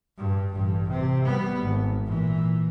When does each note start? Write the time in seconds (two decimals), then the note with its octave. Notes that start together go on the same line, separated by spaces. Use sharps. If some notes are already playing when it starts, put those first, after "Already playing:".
0.18 G2
0.52 A1 G2
0.89 C3
1.25 G3 B3
1.61 G#1
2.06 A#2 E3